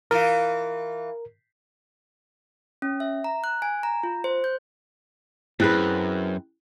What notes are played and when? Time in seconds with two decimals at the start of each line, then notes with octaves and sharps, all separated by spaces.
0.11 E3 F4 A#4
2.82 C#4
3.00 E5
3.24 A#5
3.44 F#6
3.62 G#5
3.83 A#5
4.03 F4
4.24 C5
4.44 G6
5.60 F#2 C4 E4 G#4 B4 F#6